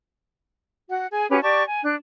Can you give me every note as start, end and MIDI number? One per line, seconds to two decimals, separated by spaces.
0.89 1.06 66
0.89 1.06 78
1.11 1.28 68
1.11 1.28 80
1.30 1.39 61
1.30 1.39 66
1.30 1.39 67
1.30 1.39 71
1.42 1.63 67
1.42 1.63 74
1.42 1.63 81
1.42 1.63 85
1.67 1.80 80
1.84 1.94 62
1.84 1.94 90